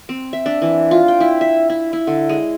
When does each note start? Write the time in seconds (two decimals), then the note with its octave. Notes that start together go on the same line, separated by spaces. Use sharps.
0.09 C4
0.33 E5
0.46 D4
0.62 E3
0.91 F4
1.08 G5
1.20 E4
1.41 E5
1.70 E4
1.93 E4
2.07 D3
2.29 G#3